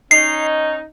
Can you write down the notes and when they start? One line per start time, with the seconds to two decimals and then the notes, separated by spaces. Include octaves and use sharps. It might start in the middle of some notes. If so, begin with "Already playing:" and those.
0.11 C#4 D#4 C7